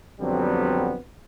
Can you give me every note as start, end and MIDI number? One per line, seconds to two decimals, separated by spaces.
0.21 0.96 41
0.21 0.96 50
0.21 0.96 54
0.21 0.96 55
0.21 0.96 59
0.21 0.96 60